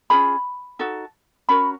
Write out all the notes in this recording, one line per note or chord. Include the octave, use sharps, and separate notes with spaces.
C#4 F4 G#4 B5
D#4 F#4 A4
C#4 F#4 A#4 B5